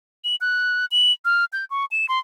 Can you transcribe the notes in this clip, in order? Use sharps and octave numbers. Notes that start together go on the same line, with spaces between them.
F#7
F#6
F#7
F6
G6
C#6
E7
C6